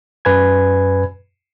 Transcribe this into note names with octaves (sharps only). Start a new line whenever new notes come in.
F#2 B4 G#5 G#6